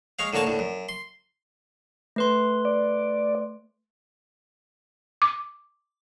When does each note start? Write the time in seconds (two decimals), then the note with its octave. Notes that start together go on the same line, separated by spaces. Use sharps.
0.19 G#3 C#5 F5
0.33 A2 D3 A#3 C#5 A5
0.47 D2 A2
0.59 F#2
0.89 C6
2.16 A3 B4 C6
2.65 D5
5.22 D6